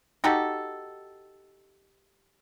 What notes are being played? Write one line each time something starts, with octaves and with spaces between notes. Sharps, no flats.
D#4 F#4 G4 A4